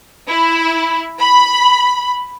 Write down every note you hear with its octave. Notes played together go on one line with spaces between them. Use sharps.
E4
B5